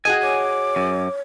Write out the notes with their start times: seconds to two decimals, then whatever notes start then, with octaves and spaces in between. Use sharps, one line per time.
0.05 F#4 G#4 D#5 G5 G#5
0.22 C#5 D6
0.76 F#2